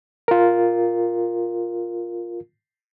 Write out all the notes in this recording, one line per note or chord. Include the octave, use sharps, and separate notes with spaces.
F4 A#4